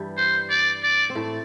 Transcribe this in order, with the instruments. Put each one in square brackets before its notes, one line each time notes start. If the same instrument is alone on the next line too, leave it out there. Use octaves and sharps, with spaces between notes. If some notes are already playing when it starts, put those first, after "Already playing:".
Already playing: [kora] G2 E3 G3
[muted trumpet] C5
D5
D5
[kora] C4
A2 A3